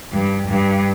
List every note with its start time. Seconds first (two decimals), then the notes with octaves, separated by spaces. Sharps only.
0.12 G2
0.48 G2